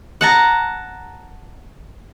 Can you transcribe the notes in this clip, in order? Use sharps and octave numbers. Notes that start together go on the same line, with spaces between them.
F#5 A5 A#5